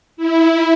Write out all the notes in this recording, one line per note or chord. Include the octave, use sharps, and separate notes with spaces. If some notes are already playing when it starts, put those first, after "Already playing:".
E4